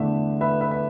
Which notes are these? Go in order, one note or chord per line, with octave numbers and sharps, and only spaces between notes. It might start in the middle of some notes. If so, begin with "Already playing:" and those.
Already playing: E2 D3 A3 D4 E5
B4 E5
B4 E5
E5